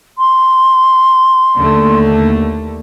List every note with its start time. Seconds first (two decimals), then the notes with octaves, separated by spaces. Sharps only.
0.18 C6
1.57 D#2 D3 A3